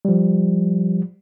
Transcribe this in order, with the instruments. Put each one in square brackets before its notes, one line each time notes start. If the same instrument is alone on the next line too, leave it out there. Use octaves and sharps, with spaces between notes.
[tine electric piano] F3 G3